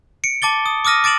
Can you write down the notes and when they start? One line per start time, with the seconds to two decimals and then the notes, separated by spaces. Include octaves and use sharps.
0.24 C#7 D7
0.42 A5 D6 A6 G7
0.66 D#6
0.85 D6 D#6 F6 A#6 D#7
1.04 D6 A6 D7 E7 F#7